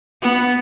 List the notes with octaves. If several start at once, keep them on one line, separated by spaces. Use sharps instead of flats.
B3